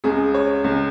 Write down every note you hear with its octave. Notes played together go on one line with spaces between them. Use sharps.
C#2 C#3 G#4
C#5
C#2 C#3